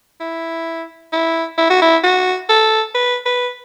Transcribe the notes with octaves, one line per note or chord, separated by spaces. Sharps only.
E4
E4
E4
F#4
E4
F#4
A4
B4
B4